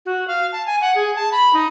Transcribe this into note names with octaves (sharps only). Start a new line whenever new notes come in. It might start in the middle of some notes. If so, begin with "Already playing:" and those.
F#4
F5
A5
G#5
F#5
G#4
A5
B5
D#4